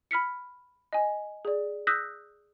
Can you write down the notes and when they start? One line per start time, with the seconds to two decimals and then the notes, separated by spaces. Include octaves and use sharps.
0.11 B5 F6 B6 C#7
0.93 D#5 G#5
1.45 G#4 D5
1.87 D#6 E6 F#6 G6 A#6 B6